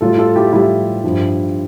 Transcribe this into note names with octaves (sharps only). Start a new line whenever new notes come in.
A2 G3 F4 A4
F4 A4
E4 G4
A2 G3 E4 G4
G2 F3